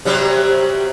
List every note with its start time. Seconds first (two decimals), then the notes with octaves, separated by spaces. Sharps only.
0.05 C3 F#3 G3